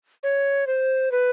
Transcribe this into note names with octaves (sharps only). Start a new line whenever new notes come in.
C#5
C5
B4